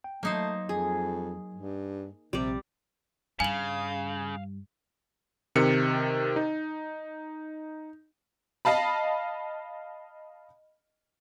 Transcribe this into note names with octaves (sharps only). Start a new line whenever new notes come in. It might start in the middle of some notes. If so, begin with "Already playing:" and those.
G5
F#3 A3 A#3 D#4 C5
F2 G#4
G2
A#1 C3 G3 C4 D5
G2 C#3 F5 G#5 F#7
C3 D#3 C#7
D#4
D#5 F5 A5 B5